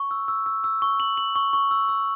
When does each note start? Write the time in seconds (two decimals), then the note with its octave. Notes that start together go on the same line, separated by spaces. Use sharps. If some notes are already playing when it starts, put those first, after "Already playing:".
Already playing: C#6
0.11 E6
0.28 E6
0.46 E6
0.64 E6
0.82 C#6
1.00 F#7
1.17 F#7
1.36 C#6
1.53 C#6
1.71 E6
1.89 E6